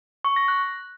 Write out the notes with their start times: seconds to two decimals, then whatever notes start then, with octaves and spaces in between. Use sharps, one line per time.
0.25 C#6
0.36 A#6
0.48 F#6